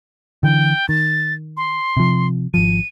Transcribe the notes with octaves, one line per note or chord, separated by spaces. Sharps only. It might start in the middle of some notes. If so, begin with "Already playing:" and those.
D3 E3 G5
D#3 A6
C6
C3 F3
G#1 F3 D#7